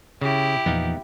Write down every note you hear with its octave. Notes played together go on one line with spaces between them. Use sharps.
C#3 E4 G4
E2 A#2 F3 B3 D#4 F5